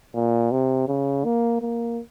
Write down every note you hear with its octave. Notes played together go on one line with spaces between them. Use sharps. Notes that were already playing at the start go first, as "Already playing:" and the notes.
A#2
C3
C#3
A#3
A#3